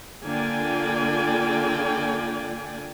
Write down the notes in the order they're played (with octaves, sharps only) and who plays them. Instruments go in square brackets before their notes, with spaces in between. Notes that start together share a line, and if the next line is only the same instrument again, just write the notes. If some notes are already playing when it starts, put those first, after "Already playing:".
[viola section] D3 A#3 F4 D5 G5 G#5